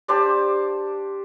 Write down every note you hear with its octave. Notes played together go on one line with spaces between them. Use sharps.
D4 G4 C5 D5